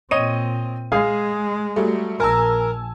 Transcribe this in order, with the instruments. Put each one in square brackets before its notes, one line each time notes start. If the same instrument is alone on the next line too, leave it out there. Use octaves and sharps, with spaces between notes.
[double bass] A#2 C4 [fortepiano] C#5 D#5 [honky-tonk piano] D#7
[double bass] G#3 [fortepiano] G#4 F5
[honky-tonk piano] F#3 G3 A3
[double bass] A#1 [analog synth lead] A#4 [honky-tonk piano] G#5 A5 E6